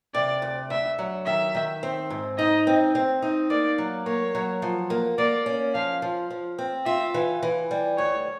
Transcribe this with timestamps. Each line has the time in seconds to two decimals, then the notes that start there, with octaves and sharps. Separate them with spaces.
0.14 C3 D5
0.42 D2
0.70 D2 E5
0.99 F#3
1.26 D#3 E5
1.55 D#3
1.83 C4
2.10 G#2
2.38 D#4 D#5
2.67 C4
2.95 C4
3.22 D#4
3.50 A#3 D5
3.78 F#3
4.06 A#3 C#5
4.35 F#3
4.62 F3
4.90 A#3
5.18 A#3 D5
5.46 C#4
5.74 F3 F5
6.02 F3
6.30 F3
6.59 C4
6.86 F4 E5
7.14 E3
7.43 E3
7.71 G3
7.98 D2 C#5